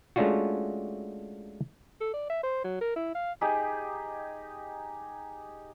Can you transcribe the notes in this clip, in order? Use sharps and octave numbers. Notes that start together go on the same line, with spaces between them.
G#3 A3 C#4 D4 F4 F#4
A4
D5
E5
C5
F#3
A#4
E4
F5
D#4 G4 G#4